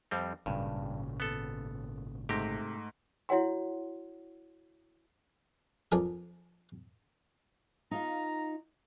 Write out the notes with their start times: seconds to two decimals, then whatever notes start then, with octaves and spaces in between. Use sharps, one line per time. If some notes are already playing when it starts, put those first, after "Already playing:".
0.11 F2 G3 C4
0.46 G#1 G2 A#2 C#3
1.20 B3 A4
2.29 G#2 C3 A3 G4 A#6
3.29 E4 F#4 C#5 F#5 C6
5.92 F2 D4 F4 A#4 G#5 D#6
7.91 D#4 F4 F5 A#5